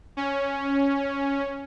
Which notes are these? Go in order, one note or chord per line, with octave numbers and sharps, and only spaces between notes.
C#4